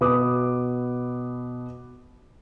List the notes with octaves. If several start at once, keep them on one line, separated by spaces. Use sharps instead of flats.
B2 B4 D6 D#6